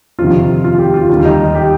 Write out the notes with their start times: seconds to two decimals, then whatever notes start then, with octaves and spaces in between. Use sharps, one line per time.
0.18 F2 C3 D#3 F4
0.64 F4
0.79 G4
0.94 F4
1.09 D#2 D#3 G3 F4
1.25 D#4
1.55 G4